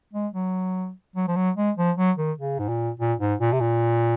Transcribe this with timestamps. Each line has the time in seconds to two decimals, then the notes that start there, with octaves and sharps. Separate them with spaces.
0.13 G#3
0.34 F#3
1.16 F#3
1.28 F3
1.36 F#3
1.56 G#3
1.77 F3
1.97 F#3
2.17 D#3
2.38 C#3
2.59 G#2
2.69 A#2
3.00 A#2
3.20 G#2
3.40 A#2
3.53 C3
3.61 A#2